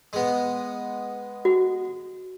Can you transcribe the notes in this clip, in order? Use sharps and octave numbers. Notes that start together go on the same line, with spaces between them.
G#3 B3
F#4